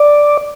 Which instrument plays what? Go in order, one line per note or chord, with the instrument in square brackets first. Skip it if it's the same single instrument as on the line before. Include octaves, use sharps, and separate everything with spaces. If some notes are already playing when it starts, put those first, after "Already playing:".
Already playing: [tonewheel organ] D5